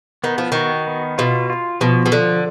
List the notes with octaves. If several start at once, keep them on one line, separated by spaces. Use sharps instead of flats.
D#3 B3
F3
D#3 F#4
B3
B2 F4
F4
B2 F3
B2
D3 F3